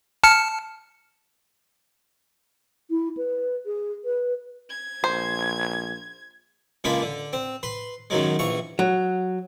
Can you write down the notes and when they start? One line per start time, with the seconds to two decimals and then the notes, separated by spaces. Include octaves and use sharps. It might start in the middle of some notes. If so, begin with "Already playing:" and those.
0.24 A5 F6 C#7
2.90 E4
3.17 B4
3.66 G#4
4.05 B4
4.70 G#6
5.04 A#1 C5
6.84 C#2 G#3 A#3 D4 B5
7.02 D3
7.33 C4
7.63 B4 C6
8.10 F#2 D#3 F#3 G#3
8.39 A#1 E3 C#6
8.79 F#3